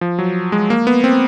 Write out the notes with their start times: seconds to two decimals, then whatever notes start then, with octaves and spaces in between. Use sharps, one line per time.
0.01 F3
0.19 F#3
0.52 G#3
0.70 A#3
0.87 B3
1.04 C4